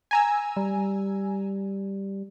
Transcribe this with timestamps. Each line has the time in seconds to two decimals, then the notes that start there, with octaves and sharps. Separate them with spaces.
0.11 G#5 A#5 E6
0.57 G3